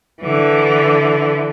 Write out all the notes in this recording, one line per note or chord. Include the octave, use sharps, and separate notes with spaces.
D3 E3